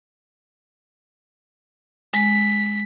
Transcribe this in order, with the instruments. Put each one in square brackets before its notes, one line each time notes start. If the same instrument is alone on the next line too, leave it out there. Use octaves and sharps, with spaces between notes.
[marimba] G#3 [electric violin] B6